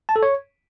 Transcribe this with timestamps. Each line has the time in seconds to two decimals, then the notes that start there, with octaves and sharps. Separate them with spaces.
0.09 A5
0.16 A4
0.23 C#5